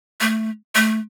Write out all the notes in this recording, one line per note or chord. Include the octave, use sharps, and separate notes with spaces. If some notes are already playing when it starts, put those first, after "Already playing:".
A3
A3